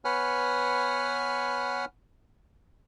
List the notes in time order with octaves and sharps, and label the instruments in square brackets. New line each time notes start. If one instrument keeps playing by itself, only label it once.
[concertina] B3 B4 C#5 F#5 G#5 F6